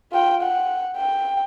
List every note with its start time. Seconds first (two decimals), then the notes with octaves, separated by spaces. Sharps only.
0.12 F4 G5
0.42 F#5
0.97 G5